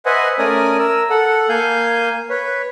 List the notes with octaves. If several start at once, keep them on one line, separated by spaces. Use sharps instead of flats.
B4 C5 D#5 E5 F#5 G#5
A3 C#4 A#4 D5 G#5 D#6
A#4 E6
A4 F#5
A#3 F5 G#5 G6
B4 C#5